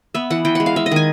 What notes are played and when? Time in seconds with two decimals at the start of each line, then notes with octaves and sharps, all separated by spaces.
0.15 B3 E5
0.30 E3 F#5
0.45 E3 G5
0.55 G#3 F#5
0.66 F5
0.76 G#3 E5
0.86 D#5
0.92 D#3 G#5